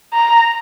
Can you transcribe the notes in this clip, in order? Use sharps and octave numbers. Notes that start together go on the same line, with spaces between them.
A#5